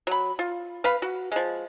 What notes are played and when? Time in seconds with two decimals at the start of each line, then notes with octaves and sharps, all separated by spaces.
0.07 F#3 B5
0.39 F4
0.84 B4 F5 B5
1.02 F#4
1.32 F3 G#3